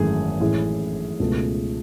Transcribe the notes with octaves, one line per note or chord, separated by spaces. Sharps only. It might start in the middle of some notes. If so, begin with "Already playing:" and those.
Already playing: G#1 F#2 E3 A3 G#4
A1 A2 G#3
C#2 B2 A3